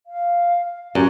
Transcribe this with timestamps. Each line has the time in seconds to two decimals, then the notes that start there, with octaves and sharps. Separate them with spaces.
0.07 F5
0.95 F#2 G4